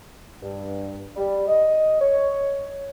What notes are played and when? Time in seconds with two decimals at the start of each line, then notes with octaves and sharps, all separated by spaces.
0.42 G2
1.16 G3
1.48 D#5
2.00 C#5